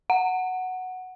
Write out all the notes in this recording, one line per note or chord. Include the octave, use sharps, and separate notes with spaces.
F#5